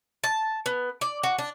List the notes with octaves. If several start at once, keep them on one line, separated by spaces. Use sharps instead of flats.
A5
B3
D5
F#4
D4